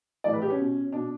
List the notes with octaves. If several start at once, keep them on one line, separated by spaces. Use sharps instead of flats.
A2 E3 D5
B4
G4
C#4
B2
B2 D4